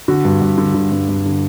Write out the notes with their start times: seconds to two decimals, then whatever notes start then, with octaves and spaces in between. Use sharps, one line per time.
0.08 D3 F#4
0.25 G2
0.42 G2
0.58 D3
0.74 D3
0.92 G2
1.09 G2
1.26 D3